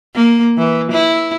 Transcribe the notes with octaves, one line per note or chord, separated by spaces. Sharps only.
A#3
E3
E4